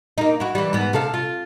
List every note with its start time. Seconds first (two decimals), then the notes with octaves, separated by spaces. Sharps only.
0.18 A#3 D#4
0.40 E4 F#4
0.55 E3 G3
0.73 G#2 B3
0.93 C3 A4 F5
1.14 F4